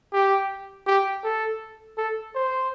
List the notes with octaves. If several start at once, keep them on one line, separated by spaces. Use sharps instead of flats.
G4
G4
A4
A4
C5